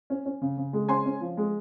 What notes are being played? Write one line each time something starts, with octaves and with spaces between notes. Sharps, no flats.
C#4
C#4
C#3
C#3
G#3
C#4 G#5 C6
C#4
F3
G#3